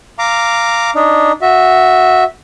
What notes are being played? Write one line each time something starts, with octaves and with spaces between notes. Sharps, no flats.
F5 A#5 D6
D4 D#4
F#4 E5